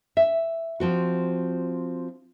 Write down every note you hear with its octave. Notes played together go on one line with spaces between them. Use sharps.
E5
F3 C4 F#4